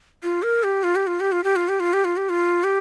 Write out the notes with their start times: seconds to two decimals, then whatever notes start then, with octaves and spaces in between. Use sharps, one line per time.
0.23 F4
0.43 A#4
0.63 G4
0.84 F4
0.96 G4
1.07 F4
1.20 G4
1.32 F4
1.44 G4
1.56 F4
1.69 G4
1.80 F4
1.93 G4
2.05 F4
2.17 G4
2.29 F4
2.64 G4